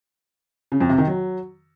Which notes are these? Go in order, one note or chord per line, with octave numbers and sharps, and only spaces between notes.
C#3
F2
C3
D#3
F#3